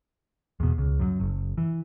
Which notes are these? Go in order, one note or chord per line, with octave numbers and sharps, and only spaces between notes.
E2 B2
C#2
F#2 D#3 F#3
F#1
E3